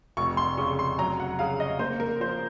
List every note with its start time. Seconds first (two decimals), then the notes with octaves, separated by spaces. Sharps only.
0.17 F1 C#6
0.37 C6
0.58 C#3 C#6
0.79 C6
0.98 F#3 A#5
1.20 F#5
1.39 C#3 F5
1.60 D#5
1.79 A#3 C5
2.00 A#4
2.20 F3 C5